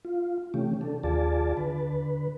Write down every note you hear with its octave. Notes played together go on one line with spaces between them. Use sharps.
F4
C3 E3 A3 C#4 G4
D4 A4
D#2 F4 G#4 D5 A5
D3 B4